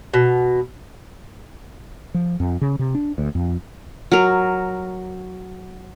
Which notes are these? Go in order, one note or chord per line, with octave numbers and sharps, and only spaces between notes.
B2
F3
F2
C#3
C3
D4
D2
F2
F#3 A#4